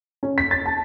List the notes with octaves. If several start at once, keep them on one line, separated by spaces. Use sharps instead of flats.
C#4
B6
A6
A5